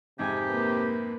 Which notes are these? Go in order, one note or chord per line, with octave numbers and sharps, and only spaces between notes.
F2 G#2 C3 G4 G#5
A#3 B4